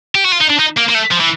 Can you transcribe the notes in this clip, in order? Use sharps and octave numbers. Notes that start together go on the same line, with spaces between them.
G4
F#4
F4
D#4
D4
D#4
A#3
A#3
A3
F3
E3